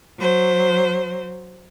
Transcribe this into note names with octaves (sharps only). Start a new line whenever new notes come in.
F#3 C5